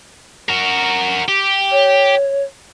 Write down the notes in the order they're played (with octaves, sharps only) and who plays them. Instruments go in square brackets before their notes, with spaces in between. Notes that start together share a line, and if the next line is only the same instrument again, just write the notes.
[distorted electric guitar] F#4 A#4
G4
[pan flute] C#5